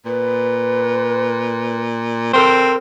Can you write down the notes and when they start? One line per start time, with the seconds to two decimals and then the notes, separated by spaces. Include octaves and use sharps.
0.05 A#2 B4
2.33 C4 A4 A#4 C5